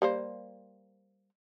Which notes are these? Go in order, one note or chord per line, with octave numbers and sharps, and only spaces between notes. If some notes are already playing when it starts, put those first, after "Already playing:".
G3 A#3 C5